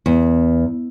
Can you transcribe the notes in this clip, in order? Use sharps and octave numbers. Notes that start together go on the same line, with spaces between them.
E2